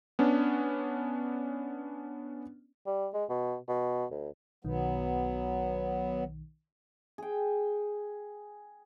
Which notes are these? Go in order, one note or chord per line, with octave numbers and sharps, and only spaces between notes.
B3 C#4 D4
G3
G#3
B2
B2
D2
B1 D#3 F#3 B3
G#4 G5